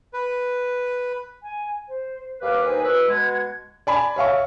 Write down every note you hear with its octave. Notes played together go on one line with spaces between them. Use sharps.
B4
G#5
C5
D#2 B4 F5 D6
D#4 C5 G#5
B2 B4 C#5 E6
B2 G#3 F#5 G#6
D5 G#5 B5
C#5 E5 F5 C#6